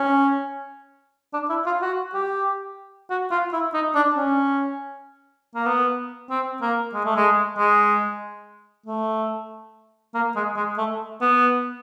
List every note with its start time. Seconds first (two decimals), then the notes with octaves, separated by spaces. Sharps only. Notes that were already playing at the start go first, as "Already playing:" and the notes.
Already playing: C#4
1.33 D4
1.49 E4
1.66 F4
1.82 F#4
2.14 G4
3.10 F#4
3.31 F4
3.53 E4
3.74 D#4
3.95 D4
4.16 C#4
5.55 A#3
5.66 B3
6.30 C4
6.62 A#3
6.94 G#3
7.05 A3
7.16 G#3
7.58 G#3
8.86 A3
10.15 A#3
10.36 G#3
10.56 G#3
10.78 A3
11.21 B3